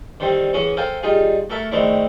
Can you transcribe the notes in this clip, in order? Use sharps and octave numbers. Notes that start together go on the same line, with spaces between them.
D3 D#3 G3 C4
E3 C#4 F#4 G#4 C#5
A4 A#4 C5 F5 G5 G#5
G3 D#4 F4 G#4
A3 F#4 A#4 E5 A5
D#3 G#3 A3 C4 D4 E4